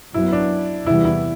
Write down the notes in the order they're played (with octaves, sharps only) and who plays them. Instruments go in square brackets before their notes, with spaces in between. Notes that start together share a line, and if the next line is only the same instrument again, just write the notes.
[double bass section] F#2 F#3 B3 [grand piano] E4
[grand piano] D4
[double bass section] E2 C3 E3 G3 B3 [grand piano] E4
[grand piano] E4